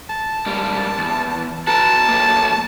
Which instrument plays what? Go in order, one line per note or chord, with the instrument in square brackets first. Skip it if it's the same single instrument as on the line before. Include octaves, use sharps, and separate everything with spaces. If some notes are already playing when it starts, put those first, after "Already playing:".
[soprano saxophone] A5
[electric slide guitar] G#2 G3 A#3
E2
[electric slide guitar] F#4 B4 A#5 [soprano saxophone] A5
[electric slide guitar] F#3 A3 A#3